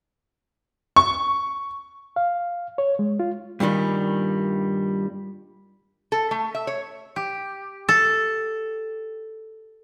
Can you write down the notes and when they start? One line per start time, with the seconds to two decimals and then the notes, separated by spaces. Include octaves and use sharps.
0.96 C#6
2.16 F5
2.78 C#5
2.99 G#3
3.20 F4
3.60 G2 A#2 D#3 G3
6.12 A4
6.31 A3
6.55 E5
6.67 C#5
7.16 G4
7.89 A4